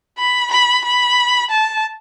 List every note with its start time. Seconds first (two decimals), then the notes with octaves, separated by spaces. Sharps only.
0.18 B5
0.52 B5
0.85 B5
1.50 A5